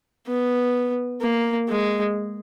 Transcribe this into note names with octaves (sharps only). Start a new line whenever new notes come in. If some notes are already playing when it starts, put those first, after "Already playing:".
B3
A#3
G#3